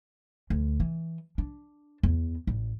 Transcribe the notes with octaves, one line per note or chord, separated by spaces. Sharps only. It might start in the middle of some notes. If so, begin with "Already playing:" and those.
D2
E3
D4
E2
A1